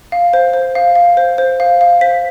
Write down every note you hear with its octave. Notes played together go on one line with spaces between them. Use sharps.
F5
C5
C5
F5
F5
C5
C5
F5
F5
C5 B6